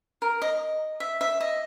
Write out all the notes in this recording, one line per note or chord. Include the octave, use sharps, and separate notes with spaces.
A#4
D#5
E5
E5
D#5